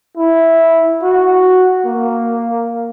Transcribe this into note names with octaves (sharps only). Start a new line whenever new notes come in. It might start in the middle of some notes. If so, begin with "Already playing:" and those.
E4
F#4
A#3